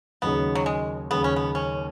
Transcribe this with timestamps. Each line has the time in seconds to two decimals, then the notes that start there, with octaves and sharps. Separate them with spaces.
0.22 D#2 C#3 F#3 B3 D#4 G#4
0.55 F#3
0.66 G#3
1.10 D#2 C#3 F#3 B3 D#4 G#4
1.24 C#4
1.36 B3
1.55 C#4